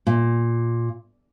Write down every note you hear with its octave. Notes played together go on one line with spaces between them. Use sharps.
A#2